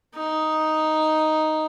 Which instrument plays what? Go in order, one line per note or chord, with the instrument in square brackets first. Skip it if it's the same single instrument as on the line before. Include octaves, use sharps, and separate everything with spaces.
[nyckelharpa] D#4